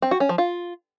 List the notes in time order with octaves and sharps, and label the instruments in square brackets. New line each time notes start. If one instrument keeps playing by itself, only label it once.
[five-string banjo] C4
F#4
C#4
F3
F4